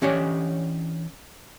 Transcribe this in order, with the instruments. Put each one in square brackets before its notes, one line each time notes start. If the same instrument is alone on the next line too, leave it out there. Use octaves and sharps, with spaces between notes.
[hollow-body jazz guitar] E3 C#4 D4 G4 C#5 D#5